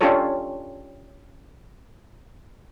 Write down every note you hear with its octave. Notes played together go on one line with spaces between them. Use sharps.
C#4 D4 F4 G4 A4 C#5